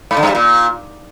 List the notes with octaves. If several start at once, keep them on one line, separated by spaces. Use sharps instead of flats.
G#2
D3
G2
G3
A#2